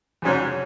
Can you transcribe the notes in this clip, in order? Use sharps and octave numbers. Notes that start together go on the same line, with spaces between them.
F2 G#2 C#3 F#3 C#4